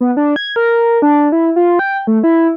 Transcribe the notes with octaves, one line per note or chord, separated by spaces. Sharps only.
B3
D4
G#6
A#4
D4
E4
F4
G5
A3
E4